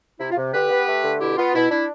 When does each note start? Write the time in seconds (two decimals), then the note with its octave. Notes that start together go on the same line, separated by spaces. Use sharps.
0.20 C3 E4
0.31 F4
0.37 C3
0.53 D3 G4 B4
0.70 B3
0.86 A3
1.03 D3
1.20 B2 E4 G4
1.37 B3 F4
1.54 B2 E4
1.70 D4 E4